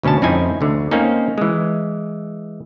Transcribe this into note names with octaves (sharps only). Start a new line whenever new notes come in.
D2 B2 C#4 D4 A5
F2 C4 C#4 D#4 E4 G#5
D2 D3
A#3 C4 C#4 D#4
E3 G#3